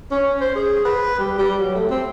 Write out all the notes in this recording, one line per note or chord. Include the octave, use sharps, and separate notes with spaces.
C#4
C5
G#4
B4
G3
G3
F#3
A3
C4